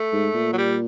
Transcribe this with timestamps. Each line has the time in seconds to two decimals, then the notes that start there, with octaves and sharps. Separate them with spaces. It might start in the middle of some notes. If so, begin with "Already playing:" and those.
Already playing: A3
0.13 G#2
0.35 A#2
0.53 F#3
0.58 G3